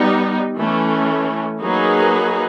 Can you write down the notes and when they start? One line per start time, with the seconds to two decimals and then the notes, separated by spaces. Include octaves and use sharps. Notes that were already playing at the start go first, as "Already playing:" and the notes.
Already playing: G3 B3 D#4
0.57 E3 A3 C#4
1.60 F#3 A#3 D#4 G#4 B4